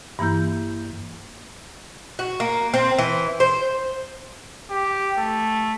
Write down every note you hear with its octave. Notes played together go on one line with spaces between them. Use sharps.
G2 E3 A#3 E4 G6
F#4
A#3
C4
E3
C5
G4
A3